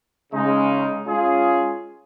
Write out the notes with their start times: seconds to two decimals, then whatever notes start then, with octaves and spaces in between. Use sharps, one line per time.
0.33 C#3 G#3 D#4
1.05 G#3 C#4 F4 G#4